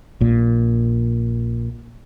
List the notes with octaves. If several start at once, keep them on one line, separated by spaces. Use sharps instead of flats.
A#1 A#2